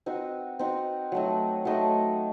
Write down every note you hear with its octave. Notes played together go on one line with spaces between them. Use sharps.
C4 D#4 F#4
C4 D#4 F#4
F#3 A3 D#4
F#3 A3 D#4